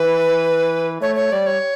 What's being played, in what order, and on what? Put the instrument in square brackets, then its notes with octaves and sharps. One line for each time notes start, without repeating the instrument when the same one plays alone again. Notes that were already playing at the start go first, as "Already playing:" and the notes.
Already playing: [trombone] E3 [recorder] B4
[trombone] A3 [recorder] C#5
[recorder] C#5
[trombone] G3 [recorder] D5
[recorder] C#5